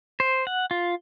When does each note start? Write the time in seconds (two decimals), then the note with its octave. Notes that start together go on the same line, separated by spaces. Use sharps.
0.20 C5
0.47 F#5
0.71 F4